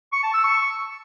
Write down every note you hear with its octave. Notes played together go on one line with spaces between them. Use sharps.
C#6
A5
E6
C#6